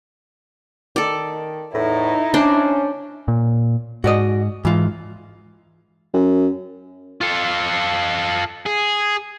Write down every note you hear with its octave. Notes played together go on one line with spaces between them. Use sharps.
D#3 A4 D5
E2 A2 D#4 E4
C#4 D4 C5 D5
A#2
G#2 F#4 D5 D#5
G#2 E3 F4
F#2
F4 A4
G#4